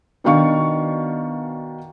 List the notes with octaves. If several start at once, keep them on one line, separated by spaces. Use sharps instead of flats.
B2 D#3 D4 F5 C#6